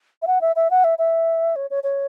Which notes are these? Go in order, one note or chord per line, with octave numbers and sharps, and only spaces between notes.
E5
F#5
E5
E5
F#5
E5
E5
C#5
C#5
C#5